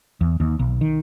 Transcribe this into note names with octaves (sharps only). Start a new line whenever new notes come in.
E2
D#2
B1
D#3